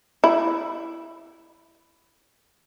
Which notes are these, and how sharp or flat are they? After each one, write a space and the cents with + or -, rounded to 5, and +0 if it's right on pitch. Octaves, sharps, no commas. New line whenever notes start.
E4 +10